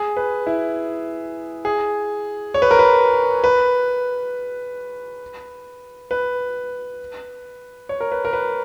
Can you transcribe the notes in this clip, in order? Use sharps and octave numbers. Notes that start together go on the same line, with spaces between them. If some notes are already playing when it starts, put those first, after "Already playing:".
Already playing: G#4
B4
E4
G#4
C#5
B4
A#4
B4
B4
B4
C#5
A#4
B4
A#4
B4